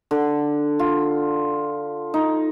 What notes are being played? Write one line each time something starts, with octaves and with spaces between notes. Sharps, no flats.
D3
F4
D#4